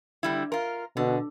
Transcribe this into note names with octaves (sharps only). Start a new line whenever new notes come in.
D3 G3 E4
F4 A#4
B2 D3